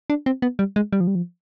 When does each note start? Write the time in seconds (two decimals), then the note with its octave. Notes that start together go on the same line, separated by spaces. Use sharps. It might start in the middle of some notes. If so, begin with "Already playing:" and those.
0.10 D4
0.26 C4
0.42 B3
0.59 G3
0.76 G#3
0.93 G3
1.00 F3
1.07 G3
1.15 F3